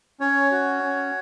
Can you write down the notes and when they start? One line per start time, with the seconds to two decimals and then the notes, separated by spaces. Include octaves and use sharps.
0.20 C#4 C#5
0.51 F#4
0.83 C#4